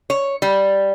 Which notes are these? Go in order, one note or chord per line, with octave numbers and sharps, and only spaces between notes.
C#5
G3